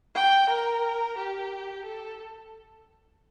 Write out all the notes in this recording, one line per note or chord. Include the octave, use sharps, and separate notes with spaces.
G5
A#4
G4
A4